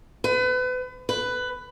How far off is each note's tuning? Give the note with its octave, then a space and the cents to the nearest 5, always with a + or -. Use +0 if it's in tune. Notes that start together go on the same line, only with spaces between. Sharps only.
B4 +35
B4 +15